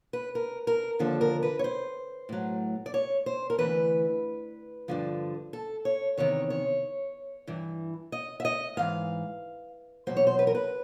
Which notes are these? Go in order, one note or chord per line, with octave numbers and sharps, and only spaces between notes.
B4
A#4
A#4
D#2 D3 F3 A4
A#4
B4
C#5
C5
A2 F#3
D5
C#5
C5
A#4
D2 C3 E3 B4
G2 D3 F3
A4
C#5
E2 C3 D#3 C#5
C#5
G2 E3
D#5
E5
D#5
G#2 E3 F5
E2 B2 F#3 C5
C#5
C5
B4
A#4
B4